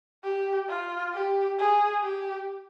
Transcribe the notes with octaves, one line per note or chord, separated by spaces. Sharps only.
G4
F4
G4
G#4
G4